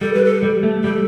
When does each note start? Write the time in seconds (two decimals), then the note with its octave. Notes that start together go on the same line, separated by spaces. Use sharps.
0.01 G3 A4
0.14 B4
0.25 A4
0.42 G3
0.63 A3
0.84 G3 A4